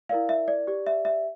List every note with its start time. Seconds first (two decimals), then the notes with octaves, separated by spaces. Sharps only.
0.09 E4 A#4 D5 F5
0.29 E5
0.48 D5
0.67 G4 D5
0.87 E5
1.05 E5